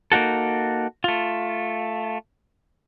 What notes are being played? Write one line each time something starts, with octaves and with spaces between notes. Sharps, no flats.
A#3 D#4 F#4 A4
A3 F4